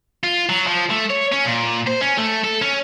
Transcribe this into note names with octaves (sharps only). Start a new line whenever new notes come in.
F4
F#3
F3
A3
C#5
C#4
A#2
C5
C#4
A3
A4
C#4